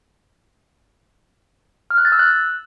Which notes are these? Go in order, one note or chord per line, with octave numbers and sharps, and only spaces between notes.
F6
F#6
A6
E6
F#6